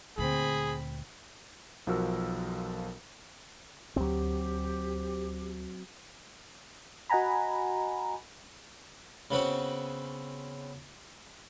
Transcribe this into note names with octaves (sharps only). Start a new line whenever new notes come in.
D2 A#2 C4 G#4 B5
B1 F3 F#4 A#4 E6
D2 F#3 C4 G4
F#4 D#5 F#5 G#5 A#5 B5
C#3 B3 C4 F#4